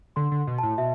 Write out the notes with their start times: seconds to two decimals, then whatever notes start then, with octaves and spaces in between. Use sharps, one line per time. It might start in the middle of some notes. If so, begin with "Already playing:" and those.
0.16 D3 C6
0.32 D3
0.47 B2
0.58 A5
0.63 A2
0.78 B2 E5